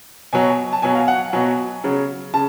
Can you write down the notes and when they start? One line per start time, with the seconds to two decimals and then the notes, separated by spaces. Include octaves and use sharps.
0.33 B2 F#3 G#5
0.72 A5
0.82 B2 F#3 G#5
0.95 F5
1.08 F#5
1.33 B2 F#3 G#5
1.84 C#3 F#3
2.34 C#3 A5